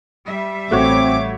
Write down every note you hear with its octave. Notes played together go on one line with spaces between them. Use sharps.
G3 E5
A1 A3 C4 F#4 C#5 D6